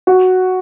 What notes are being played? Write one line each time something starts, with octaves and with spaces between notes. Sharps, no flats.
F#4